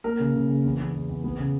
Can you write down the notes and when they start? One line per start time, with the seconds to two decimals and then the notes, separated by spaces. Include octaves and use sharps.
0.04 A#3 A#4
0.20 C#3
0.34 C#3
0.49 C#3
0.64 E2
0.79 E2
0.94 E2
1.09 E2
1.24 B3
1.39 C#3